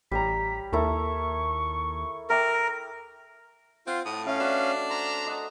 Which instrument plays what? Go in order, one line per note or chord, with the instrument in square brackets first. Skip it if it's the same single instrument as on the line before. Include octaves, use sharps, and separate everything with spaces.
[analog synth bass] A1 [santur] G3 C#5 A#5 [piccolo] B6
[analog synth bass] D#2 [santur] E4 A4 A#4 [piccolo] C#6
[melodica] A#4 [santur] E5 G5 D6 [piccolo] A#6
[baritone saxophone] C4 [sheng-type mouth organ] F4 [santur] F#5
[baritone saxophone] A2 [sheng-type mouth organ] D#6
[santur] A3 [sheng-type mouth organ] C#4 F5
[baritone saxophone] D4 [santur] F#4 B4 F#5
[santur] C5 [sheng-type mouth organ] A#5
[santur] D#5 F#5 D#6